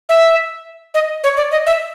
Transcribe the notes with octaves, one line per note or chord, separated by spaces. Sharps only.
E5
D#5
C#5
D5
D#5
E5